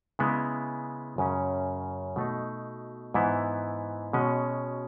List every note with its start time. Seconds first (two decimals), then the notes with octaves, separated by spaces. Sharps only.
0.19 C#3 G#3 B3 E4
1.18 F#2 C#3 F#3 C#4
2.16 B2 A3 D#4
3.14 G#2 E3 B3 E4
4.13 B2 G#3 C#4